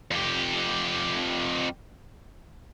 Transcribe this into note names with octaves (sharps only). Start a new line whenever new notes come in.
F2 G4